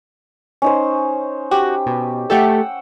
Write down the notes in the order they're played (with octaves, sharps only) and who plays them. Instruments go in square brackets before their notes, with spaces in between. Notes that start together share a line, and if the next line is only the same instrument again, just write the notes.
[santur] C#4 D#4 C5
[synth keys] F#4 [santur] G4
[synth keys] B2
[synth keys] A3 G4 A4 [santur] F#5 G5 E6